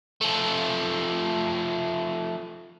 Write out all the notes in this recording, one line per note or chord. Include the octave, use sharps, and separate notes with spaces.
F3 A3